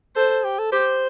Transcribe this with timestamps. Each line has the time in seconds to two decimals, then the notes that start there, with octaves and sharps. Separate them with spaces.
0.16 A4 C5
0.44 G4
0.59 A4
0.72 G4 C5